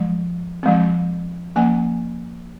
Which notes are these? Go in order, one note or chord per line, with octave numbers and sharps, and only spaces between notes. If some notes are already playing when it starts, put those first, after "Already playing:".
Already playing: F3 G#3
F3 G#3 C4
F3 A#3 C#4 G#5